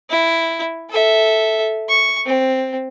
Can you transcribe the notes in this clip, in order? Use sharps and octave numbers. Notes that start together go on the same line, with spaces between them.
E4
A4 E5
C#6
C4